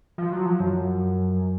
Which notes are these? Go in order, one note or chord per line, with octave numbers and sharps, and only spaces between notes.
F3
F#3
F3
F#2